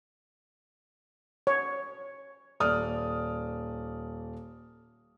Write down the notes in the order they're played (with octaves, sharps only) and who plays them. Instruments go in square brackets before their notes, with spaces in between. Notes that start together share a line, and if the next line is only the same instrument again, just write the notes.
[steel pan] C#5
[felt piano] D#1 D5 D#6 F6